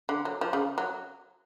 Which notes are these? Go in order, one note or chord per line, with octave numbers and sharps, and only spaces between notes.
D3
F#3
F3
C#3
F#3